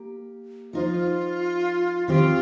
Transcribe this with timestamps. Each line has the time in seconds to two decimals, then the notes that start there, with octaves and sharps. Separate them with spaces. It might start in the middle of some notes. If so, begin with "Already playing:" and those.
Already playing: A#3 G4
0.73 F3 D#4 F4 C5
2.07 D#3 C4 F4 G4